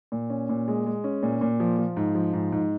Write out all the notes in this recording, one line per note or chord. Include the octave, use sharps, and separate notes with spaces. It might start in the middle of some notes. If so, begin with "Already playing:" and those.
A#2
C#4
A#2
G#3
G#3
C#4
A#2
A#2
F3
F3
G#2
F3
G#2
G#2